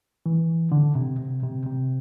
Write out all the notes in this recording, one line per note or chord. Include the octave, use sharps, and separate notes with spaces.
E3
D3
C3
C3
C3
C3